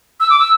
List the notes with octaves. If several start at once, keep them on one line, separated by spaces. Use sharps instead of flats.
E6
D6
E6